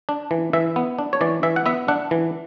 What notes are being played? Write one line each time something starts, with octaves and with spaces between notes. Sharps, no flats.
D4
E3
E3 E5
B3
D4
C#5
E3 D5
E3 E5
F#5
B3 E5
D4 F#5
E3